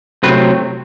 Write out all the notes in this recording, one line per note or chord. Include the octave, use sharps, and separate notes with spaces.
C3 F#3 A3 C4 B4